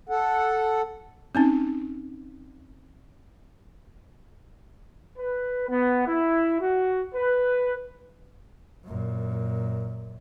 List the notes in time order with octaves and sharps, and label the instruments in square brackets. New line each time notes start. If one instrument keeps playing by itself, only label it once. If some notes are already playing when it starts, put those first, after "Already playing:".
[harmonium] A4 F#5
[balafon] C4 C#4 D#4
[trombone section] B4
B3
E4
F#4
B4
[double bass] F#2 A#2